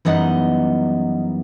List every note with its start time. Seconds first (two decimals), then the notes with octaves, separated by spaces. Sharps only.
0.05 F#2 E3 G3 B3 D#4 D#5 F#5